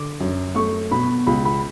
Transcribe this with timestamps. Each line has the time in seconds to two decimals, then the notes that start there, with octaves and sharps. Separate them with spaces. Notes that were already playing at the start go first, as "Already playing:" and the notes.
Already playing: D3 D6
0.20 F#2
0.55 A3 C#6
0.91 B2 B5
1.27 C#2 B5
1.45 B5